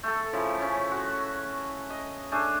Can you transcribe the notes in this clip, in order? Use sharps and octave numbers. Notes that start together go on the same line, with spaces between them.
A3 A4
C#3 F3 E4
C#4 C#5
F#4
D#5
A3 D4 G#4